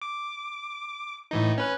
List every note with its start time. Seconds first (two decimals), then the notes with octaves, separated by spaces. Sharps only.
0.02 D6
1.31 A2 E3 D#4
1.58 C#4 B4 F#6